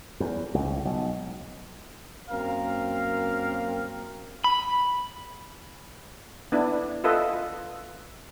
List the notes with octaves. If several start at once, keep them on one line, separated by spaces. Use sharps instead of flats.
E2
C#2
B1
F#2 A#3 C4 A#4 F5
B5
B3 D4 E4
F4 A4 B4 D#5 E5